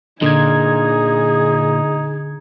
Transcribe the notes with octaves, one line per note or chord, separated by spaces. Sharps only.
A#2 D3 D#4 G#4 G#6